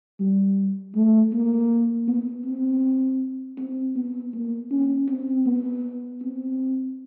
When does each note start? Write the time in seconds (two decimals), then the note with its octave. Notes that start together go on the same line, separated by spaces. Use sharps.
0.20 G3
0.95 A3
1.33 A#3
2.08 B3
2.46 C4
3.58 C4
3.96 B3
4.33 A#3
4.71 C#4
5.09 C4
5.46 B3
6.22 C4